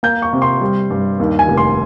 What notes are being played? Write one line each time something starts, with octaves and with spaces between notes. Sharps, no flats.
A#3 G6
C#6
C3
C6
G3
G2
D#2
G#5
F1
C6